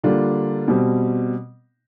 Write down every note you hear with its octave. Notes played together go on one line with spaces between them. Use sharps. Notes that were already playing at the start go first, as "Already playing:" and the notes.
D3 G3 A#3 D4 F4
B2 G3 C4